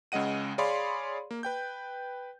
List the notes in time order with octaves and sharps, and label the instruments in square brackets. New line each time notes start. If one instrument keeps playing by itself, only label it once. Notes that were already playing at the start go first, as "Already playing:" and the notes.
[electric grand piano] C#2 C#3 G#3 D#5 F#5 D#7
G#4 C#5 D5 F5 B5 C6
A#3
B4 G5 G6